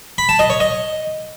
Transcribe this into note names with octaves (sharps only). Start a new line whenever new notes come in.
B5
A5
D#5
C#5
D#5